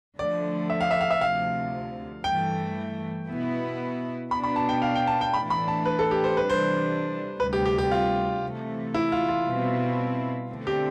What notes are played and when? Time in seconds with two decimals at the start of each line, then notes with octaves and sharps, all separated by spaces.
0.19 D3 F3 A3 D5
0.70 E5
0.81 F5
0.91 E5
1.01 F5
1.11 E5
1.21 D2 C3 F3 F5
2.24 G2 E3 A3 G5
3.28 B2 B3 E4
4.31 B2 B3 D4 B5
4.44 B5
4.56 A5
4.69 G5
4.82 F5
4.95 G5
5.07 A5
5.21 G5
5.34 A2 E3 A3 D4 B5
5.50 B5
5.68 A5
5.85 B4
5.99 A4
6.11 G4
6.24 C5
6.37 C3 E3 G3 D4 B4
6.50 C5
7.40 D2 C3 G3 B4
7.53 G4
7.66 G4
7.78 G4
7.91 F4
8.42 C3 E3 A3
8.94 E4
9.12 F4
9.28 F4
9.46 B2 G3 C4 E4
10.49 D3 A3 C4
10.67 G4